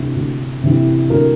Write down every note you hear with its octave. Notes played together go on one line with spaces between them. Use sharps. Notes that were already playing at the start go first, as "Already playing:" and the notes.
Already playing: D2 C3 E3
D2
C3 E3
D2 A#4